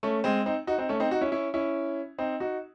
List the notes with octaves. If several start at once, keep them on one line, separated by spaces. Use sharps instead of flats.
A3 C#4
G#3 C4
C4 D#4
D#4 F#4
C4 D#4
A3 C#4
C4 D#4
D#4 F#4
C#4 E4
C#4 E4
C#4 E4
C4 D#4
D#4 F#4